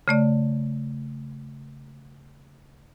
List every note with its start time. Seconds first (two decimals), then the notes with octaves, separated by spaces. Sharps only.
0.08 C#3 A3 D5